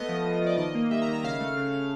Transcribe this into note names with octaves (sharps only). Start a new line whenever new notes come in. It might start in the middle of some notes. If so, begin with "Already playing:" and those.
Already playing: A3 B3 D#5
F3
F3
F3 D5
D#3 D#5
A#3
G3 E5
A#5
D#3
A#5
C#3 F5
A3
C#3
C#3